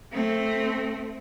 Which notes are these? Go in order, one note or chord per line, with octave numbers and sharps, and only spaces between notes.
A3 C4